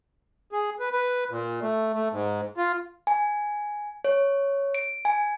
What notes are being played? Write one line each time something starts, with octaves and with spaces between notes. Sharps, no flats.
G#4
B4
B4
A#2
A3
A3
G#2
F4
G#5
C#5
D7
G#5